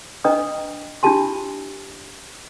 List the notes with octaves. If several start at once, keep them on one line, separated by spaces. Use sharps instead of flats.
D4 B4 D#5 G5 A#5 D#6
D4 E4 F4 G4 A5 C6